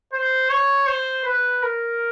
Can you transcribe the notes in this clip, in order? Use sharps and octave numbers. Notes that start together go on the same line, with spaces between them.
C5
C#5
C5
B4
A#4